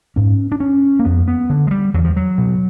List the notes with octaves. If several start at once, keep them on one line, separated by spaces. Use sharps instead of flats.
G#2 C#4
D4
C#4
A#3
F2 B3
B3
D3
G#3
G3
E2 F#3
F3
F#3
B2